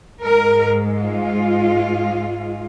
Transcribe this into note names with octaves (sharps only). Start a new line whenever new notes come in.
G#2 G#3 A#4
F4